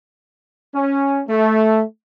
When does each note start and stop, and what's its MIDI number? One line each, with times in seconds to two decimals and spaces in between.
0.74 1.21 61
1.28 1.82 57